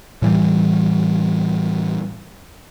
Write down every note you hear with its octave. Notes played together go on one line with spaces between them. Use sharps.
A2 E3 G3